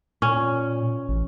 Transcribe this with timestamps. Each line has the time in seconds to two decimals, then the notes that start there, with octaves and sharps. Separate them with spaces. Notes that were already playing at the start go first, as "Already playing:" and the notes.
0.22 A#2 C#4
1.08 A1